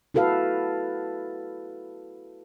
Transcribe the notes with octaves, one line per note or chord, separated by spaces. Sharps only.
E4 F#4 A4 B4 F5